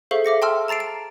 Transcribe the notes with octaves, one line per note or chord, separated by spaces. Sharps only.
G#4 A4 C5 E5 F5 C#6
E5 D6 A#6 C#7
G5 A5 C6 E6 F6
A5 A#5 A6 C7 D7
D7